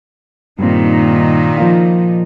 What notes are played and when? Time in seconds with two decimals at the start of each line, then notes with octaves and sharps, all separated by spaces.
0.59 G2 A#2 D#3 C4 D#4
1.58 F3 A#3 F4